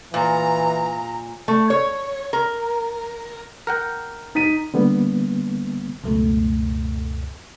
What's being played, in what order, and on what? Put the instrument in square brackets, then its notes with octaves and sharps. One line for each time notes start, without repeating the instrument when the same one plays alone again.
[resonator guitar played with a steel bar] A#2 [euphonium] E3 [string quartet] A#5
[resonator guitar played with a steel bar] A3
C#5
A#4
[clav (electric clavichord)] A#4 F#5 G5
[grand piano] D#4 B6 D#7
[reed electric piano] D3 G3 A#3 B3
[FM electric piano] C#2 F#2 B2 A3